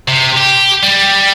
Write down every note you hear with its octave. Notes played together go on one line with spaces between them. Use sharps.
C3
G4
G3